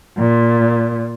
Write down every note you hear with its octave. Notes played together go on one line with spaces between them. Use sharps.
A#2